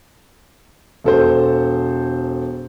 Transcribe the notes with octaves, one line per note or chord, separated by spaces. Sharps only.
E1 A4 C5